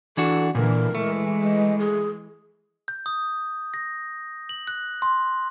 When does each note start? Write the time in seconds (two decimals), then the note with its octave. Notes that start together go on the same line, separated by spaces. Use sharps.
0.17 E3 D4 F#4 A4
0.55 A#2 D3 E3 A#4
0.95 E3 G#3 A3
1.42 D#5
1.79 G#4
2.88 G6
3.06 D#6
3.74 A#6
4.49 F#7
4.67 F#6
5.02 C6